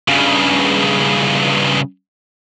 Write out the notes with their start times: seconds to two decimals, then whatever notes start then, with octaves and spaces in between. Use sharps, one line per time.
0.08 G2 C#3